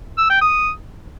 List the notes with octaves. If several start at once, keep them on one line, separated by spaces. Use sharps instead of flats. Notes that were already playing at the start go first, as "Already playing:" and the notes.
E6
G5
D#6